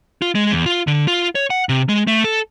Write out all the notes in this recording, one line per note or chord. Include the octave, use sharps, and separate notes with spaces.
F4
G#3
E2
F4
D3
F4
C#5
F#5
C3
G#3
A3
A4